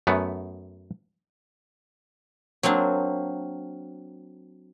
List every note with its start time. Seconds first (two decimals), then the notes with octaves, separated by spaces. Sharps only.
0.07 F#2 A3 B3
2.63 F#3 A#3 C4 D4